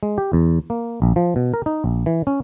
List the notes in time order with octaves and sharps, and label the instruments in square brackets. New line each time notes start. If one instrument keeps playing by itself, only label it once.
[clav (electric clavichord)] G#3
G4
E2
A#3
A#1
F3
B2
A#4
D#4
A#1
E3
C#4